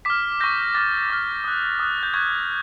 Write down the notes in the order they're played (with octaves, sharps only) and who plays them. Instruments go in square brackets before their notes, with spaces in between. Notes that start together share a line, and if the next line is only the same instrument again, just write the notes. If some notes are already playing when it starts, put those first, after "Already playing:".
[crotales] D6 F6 B6
C#6 E6 G6 A#6
D6 F6 A6
D6 F6
D#6 F#6
D#6 F#6
G6
C#6 F#6 G#6